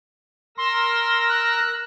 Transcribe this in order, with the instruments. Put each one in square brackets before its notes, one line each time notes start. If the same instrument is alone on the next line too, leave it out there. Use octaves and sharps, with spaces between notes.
[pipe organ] A#4 E6 A#6 [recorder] C6
[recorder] F#6